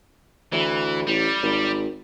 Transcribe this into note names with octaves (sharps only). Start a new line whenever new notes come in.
D2 E3
A1 G3
G#1